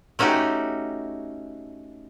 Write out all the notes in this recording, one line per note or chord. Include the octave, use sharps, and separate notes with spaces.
A3 C#4 D#4 F#4 G4